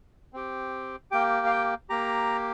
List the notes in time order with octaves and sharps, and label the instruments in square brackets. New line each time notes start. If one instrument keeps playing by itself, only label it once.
[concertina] C4 G4
A#3 G4 G5
F5
G5
A#3 G4 A#5